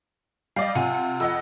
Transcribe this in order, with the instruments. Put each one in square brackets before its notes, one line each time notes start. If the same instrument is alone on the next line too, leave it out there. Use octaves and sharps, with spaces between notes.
[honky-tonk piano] G3 D5 D#5 [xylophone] F5
[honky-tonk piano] C3 F4 [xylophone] F#5 G#5
[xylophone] F#5
[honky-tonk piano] F2 D#5 F#5 [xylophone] E6